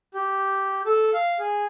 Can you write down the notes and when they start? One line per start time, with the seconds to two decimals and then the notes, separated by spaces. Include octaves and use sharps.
0.14 G4
0.86 A4
1.13 F5
1.39 G#4